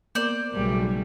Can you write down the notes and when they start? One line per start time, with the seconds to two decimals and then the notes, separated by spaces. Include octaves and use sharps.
0.15 A#3 B3 A#4 C5 D5
0.54 B1 C#3 F#3 G3 A3